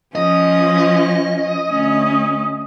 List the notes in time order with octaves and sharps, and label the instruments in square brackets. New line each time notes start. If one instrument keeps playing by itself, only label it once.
[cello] F3 C#4 [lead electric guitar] D#5
[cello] D2 C#4